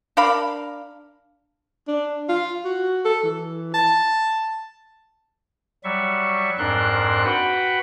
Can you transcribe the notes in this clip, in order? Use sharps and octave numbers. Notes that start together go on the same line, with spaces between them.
D4 A#4 F5 B5
D4
F4
F#4
A4
E3
A5
F#3 G3 E5 C#6
F2 G#2 D4 A#4 C6 F#6
F#4 B4 F#5 G5 B5